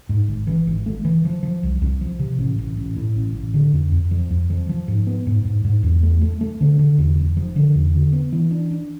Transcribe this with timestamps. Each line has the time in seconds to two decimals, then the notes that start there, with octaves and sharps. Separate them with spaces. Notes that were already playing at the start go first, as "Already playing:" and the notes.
0.09 G#2
0.28 G#1
0.47 E3
0.67 G#1
0.86 A3
1.05 E3
1.25 F3
1.43 F3
1.63 C2
1.82 C2
2.01 F3
2.19 C3
2.39 A1
2.59 A1
2.77 A1
2.96 A2
3.15 A1
3.35 A1
3.54 D3
3.73 F2
3.92 F2
4.11 F3
4.31 F2
4.50 F3
4.69 F3
4.88 G#2
5.07 B3
5.27 G#2
5.45 G#2
5.64 G#2
5.83 E2
6.03 A3
6.21 A3
6.41 A3
6.61 D3
6.79 D3
6.98 E2
7.17 F1
7.37 F3
7.56 D3
7.75 E2
7.93 D3
8.13 B3
8.32 E3
8.51 D4
8.71 D4